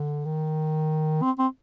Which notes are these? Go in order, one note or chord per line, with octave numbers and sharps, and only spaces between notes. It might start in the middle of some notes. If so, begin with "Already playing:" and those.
Already playing: D3
D#3
C4
C4